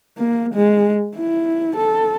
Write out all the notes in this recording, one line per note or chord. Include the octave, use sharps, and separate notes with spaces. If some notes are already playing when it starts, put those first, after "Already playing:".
A#3
G#3
E4
A4